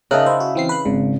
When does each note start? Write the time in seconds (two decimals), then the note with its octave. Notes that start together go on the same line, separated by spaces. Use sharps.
0.11 C#3 C#4 D#4 A#4 E5 F5 A5 F#6
0.26 E4 C5
0.40 F#4
0.55 E3 C4 C7
0.69 B4 F#6
0.85 G#1 C#3